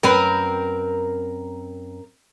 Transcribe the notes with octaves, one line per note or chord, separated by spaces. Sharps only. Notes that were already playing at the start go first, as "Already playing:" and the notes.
F#2 C4 A#4 B4